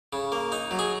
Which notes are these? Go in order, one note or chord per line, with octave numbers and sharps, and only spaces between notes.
C#3
A#3
D#4
F#3
G#4